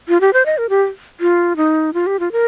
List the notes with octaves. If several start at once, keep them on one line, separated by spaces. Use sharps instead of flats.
F4
G4
C5
D#5
A#4
G4
F4
D#4
F4
G4
F4
A#4